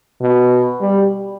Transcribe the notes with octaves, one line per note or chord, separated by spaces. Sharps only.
B2
G3